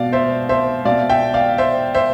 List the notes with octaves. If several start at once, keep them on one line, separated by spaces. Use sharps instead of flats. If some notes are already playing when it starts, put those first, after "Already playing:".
Already playing: B2 D5 F5
C5 E5
C5 E5
B2 D5 F5
E5 G5
D5 F5
C5 E5
C5 E5